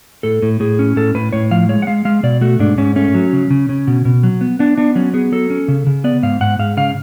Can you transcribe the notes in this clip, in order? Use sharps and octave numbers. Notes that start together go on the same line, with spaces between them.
A2 A4
A2
A2 G#4
C#4
A2 A4
A2 B4
A2 C#5
F3 F5
G#3 C#5
F#5
G#3 F5
G#3 F5
B2 D5
A3 F#4
G#2 D4
G#2 C#4
A3 C#4
F#3
C#3
C#3
C#3
B2
B2
F#3
B3
B3 D4
B3 D4
F#3 C#4
B3 G#4
F#3 A4
C#4
C#3
C#3
B3 D5
G#2 F5
G#2 F#5
G#2 F5
C#3 F5